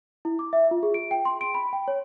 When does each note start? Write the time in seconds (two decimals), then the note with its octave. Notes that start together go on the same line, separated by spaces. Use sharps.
0.25 E4
0.39 D6
0.53 E5
0.71 F4
0.83 G#4
0.94 D7
1.11 G5
1.25 C6
1.41 D7
1.54 B5
1.73 G5
1.88 C#5